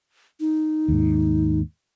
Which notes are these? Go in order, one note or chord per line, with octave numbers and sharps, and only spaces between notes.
D#4
D#2 G#2